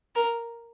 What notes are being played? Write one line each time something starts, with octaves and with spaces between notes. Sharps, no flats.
A#4